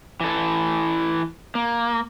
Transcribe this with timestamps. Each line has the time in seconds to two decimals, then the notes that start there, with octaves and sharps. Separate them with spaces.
0.21 E3 A4
1.55 A#3